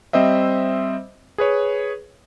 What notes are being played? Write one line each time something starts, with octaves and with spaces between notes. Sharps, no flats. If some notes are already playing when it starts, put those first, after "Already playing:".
G3 C4 C5 D#5 E5
G#4 B4 C#5